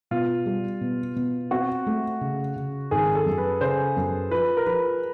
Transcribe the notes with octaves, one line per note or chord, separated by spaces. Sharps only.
B2 F4
G3
B2
B2
C4 F#4
A3
C#3
C#3
G#1 G#4
A4
F#2
B4
C#3 C5
F#2
F3 B4
A#4
F3 B4